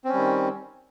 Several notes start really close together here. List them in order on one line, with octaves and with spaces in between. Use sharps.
C4 C#4 G3 D#3